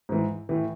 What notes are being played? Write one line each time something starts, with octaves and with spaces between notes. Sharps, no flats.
G#2 E3
A2 E3